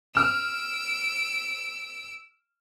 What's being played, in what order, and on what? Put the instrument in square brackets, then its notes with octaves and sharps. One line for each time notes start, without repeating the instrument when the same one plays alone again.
[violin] E6 D7 [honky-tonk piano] F6 E7